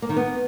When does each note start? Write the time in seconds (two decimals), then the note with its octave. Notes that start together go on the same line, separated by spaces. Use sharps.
0.02 A#3
0.09 D#3
0.17 B3